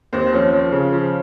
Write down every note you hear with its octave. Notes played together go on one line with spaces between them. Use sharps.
D#2 C4
F3 C#4
F3
C#3
F3